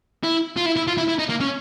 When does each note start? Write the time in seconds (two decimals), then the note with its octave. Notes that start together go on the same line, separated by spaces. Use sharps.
0.23 E4
0.57 F4
0.65 E4
0.76 E4
0.87 F4
0.97 E4
1.08 E4
1.19 D#4
1.29 A#3
1.40 C#4